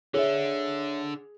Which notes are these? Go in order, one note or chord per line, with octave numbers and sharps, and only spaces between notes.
D3 G#4 C#5 E5